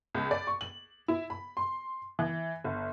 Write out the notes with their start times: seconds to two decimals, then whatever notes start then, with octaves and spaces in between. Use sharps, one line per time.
0.15 C#2
0.31 D5
0.47 C#6
0.61 F#7
1.08 E4
1.30 B5
1.57 C6
2.19 E3
2.64 G1